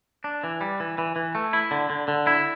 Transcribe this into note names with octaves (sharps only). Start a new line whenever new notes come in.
D4
E3
G3
E3
E3
E3
A3
E4
D3
D3
D3
E4